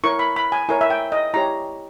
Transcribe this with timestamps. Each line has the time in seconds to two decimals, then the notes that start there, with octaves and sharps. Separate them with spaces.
0.04 E4 A#4 C#5 C#6
0.19 B5
0.36 B5
0.52 G#5
0.69 E4 A#4 C#5 G#5
0.81 E5
0.90 G5
1.12 D#5
1.34 E4 G4 C#5 A#5